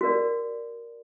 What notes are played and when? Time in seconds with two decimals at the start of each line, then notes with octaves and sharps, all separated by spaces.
0.01 F#4 A#4 D5